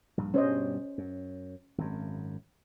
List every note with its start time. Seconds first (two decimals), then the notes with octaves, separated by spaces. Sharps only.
0.17 A#1 G2
0.34 G2 B2 G3 C#4 C5 D#5
0.98 F#2
1.78 G#1 F#2